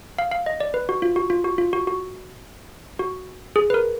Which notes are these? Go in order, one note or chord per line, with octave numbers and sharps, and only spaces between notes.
F5
F5
D#5
D5
B4
F#4
F4
F#4
F4
F#4
F4
F#4
F#4
F#4
G#4
B4
A#4